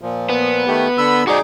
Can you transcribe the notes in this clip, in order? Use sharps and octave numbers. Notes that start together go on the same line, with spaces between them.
A#2 F3
B3
D#3 A3 G4
D3 B5 E6
D#4 F#4 G#4 D5 D6